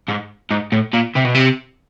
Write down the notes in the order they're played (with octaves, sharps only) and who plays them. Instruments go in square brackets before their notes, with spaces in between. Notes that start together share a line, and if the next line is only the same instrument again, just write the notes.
[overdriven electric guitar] G#2
G#2
A2
A#2
C3
B2
C3